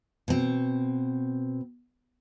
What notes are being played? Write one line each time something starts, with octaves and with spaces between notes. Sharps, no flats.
B2 C4